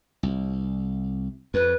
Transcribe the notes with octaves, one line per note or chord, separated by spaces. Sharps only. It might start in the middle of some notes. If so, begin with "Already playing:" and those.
C2
F2 B4